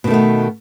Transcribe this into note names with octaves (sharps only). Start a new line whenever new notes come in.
B2 D#3 A3 B3